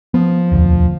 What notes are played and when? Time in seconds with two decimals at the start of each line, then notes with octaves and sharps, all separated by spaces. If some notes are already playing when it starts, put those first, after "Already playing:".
0.14 F3 B3
0.52 E1 D2